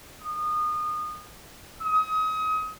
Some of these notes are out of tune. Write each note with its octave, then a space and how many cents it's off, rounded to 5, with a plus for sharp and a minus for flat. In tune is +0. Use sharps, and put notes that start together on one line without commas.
D#6 -25
D#6 +30